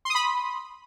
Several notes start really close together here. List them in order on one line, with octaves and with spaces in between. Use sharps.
C6 D#6 B5